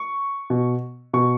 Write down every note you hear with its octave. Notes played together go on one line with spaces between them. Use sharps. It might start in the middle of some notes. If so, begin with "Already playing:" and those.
Already playing: C#6
B2
B2 C#6